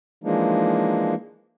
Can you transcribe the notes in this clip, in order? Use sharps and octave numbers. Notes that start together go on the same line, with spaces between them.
E3 F3 G#3 A#3 D4 D#4